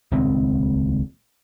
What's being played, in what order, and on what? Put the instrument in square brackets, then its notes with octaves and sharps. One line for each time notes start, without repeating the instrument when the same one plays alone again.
[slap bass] D#1 C#2 D#3 C4